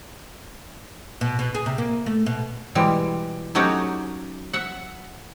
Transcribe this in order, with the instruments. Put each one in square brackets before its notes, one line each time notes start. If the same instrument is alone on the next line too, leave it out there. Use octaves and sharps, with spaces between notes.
[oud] B2
B2
G#4
C3
A#3
A3
B2
[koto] B2 E3 G3 G#3
F#3 A3 C#4 D#4 F#4 G4
E5 F#5